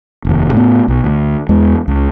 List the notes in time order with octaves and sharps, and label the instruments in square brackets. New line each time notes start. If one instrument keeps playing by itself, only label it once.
[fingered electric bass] F1 D#2
A2 B3
B1
D2
E2 G#3
C#2